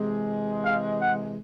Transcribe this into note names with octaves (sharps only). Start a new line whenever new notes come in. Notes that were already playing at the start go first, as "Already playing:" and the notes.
Already playing: C3 E3 G#3
F5
F#5